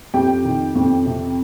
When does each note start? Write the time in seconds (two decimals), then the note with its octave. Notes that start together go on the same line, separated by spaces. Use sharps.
0.14 F2 G4 G5
0.44 D#3
0.75 F2
1.06 C3